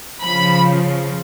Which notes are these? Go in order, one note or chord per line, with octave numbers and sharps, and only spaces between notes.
C#3 F3 B5